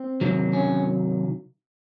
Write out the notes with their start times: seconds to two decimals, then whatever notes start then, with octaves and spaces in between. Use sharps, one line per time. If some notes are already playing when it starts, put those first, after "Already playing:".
Already playing: C4
0.21 C3 D#3 F#3
0.53 C#4